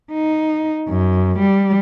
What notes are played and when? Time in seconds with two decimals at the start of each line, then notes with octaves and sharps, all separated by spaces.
0.12 D#4
0.89 F#2
1.39 G3